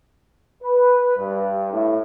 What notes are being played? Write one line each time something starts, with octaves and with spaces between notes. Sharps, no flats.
B4
G2
A2